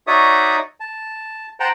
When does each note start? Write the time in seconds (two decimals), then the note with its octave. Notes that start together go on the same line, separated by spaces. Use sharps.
0.07 D#4 F#4 C#5 D5 E5 D#6
0.80 A5
1.60 C5 F#5 G5 A5 A#5